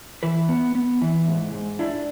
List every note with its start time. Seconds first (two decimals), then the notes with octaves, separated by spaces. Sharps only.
0.23 E3 B4
0.49 B3
0.75 B3
1.02 E3
1.28 G#2
1.54 G#2
1.79 D4 E4